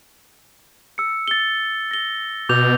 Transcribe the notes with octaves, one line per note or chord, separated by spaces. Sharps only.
E6 C#7
A6 G7
A#6 G7
B2 D6 G6 F7